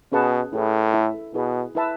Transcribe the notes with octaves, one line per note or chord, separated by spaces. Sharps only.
B2 C#4 G#4 B4 F#5 A5
A2 E4 G#4 B4
E4 A4 E5
B2 E4 G#4 B4
E4 B4 E5 A5